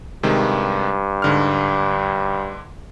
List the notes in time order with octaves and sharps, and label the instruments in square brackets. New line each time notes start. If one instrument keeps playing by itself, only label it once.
[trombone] G2 [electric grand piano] C3 D#3 G#3
[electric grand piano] G#2 D3 F6